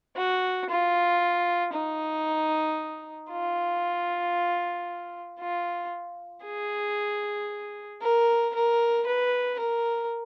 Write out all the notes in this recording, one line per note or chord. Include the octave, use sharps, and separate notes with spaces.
F#4
F4
D#4
F4
F4
G#4
A#4
A#4
B4
A#4